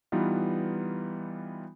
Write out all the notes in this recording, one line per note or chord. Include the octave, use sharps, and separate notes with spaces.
E3 G3 B3 D#4 F4